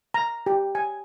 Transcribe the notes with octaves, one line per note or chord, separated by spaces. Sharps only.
A#5
G4
G#5